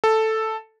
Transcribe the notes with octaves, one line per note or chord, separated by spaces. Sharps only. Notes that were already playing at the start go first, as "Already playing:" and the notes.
A4